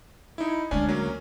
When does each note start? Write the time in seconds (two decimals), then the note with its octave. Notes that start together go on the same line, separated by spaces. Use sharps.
0.38 D#4 E4
0.71 D2 G#3 C#4 D4 G#5
0.89 F#3 A#3 C#4